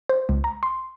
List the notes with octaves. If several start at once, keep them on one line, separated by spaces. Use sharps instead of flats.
C5
C#2
A#5
C6